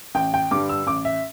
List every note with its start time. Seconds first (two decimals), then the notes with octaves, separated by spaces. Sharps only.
0.15 A1 G5
0.34 G5
0.51 G2 D3 G3 D6
0.69 E6
0.87 A1 D6
1.05 E5